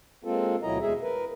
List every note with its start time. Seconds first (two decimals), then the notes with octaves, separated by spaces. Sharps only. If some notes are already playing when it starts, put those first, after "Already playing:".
0.24 G#3 A#3 C4 F4 A4
0.63 D2 B2 F#3 E4 D#5 A#5
0.80 E2 G#3 G#4 E5
1.02 A#4 B4